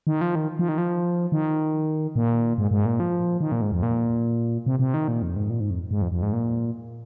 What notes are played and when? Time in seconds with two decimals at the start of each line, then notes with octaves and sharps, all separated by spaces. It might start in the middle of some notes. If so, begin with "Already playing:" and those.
0.07 D#3
0.21 F3
0.35 D#3
0.59 F3
0.69 D#3
0.78 F3
1.32 D#3
2.16 A#2
2.58 G#2
2.71 G#2
2.86 A#2
3.00 F3
3.41 D#3
3.52 A#2
3.62 G#2
3.72 F2
3.83 A#2
4.66 C3
4.79 C3
4.94 D#3
5.08 A#2
5.22 F2
5.36 G#2
5.50 A#2
5.60 G#2
5.71 F2
5.91 G#2
6.02 F2
6.12 F2
6.22 G#2
6.33 A#2